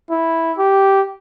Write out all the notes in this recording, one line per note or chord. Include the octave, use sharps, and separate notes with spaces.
E4
G4